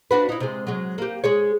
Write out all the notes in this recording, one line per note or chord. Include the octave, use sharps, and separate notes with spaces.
D4 F#4 B4
D#4 E4
C3 G#3
F#3 G#3
A#3 G4
G#3 G#4 C#5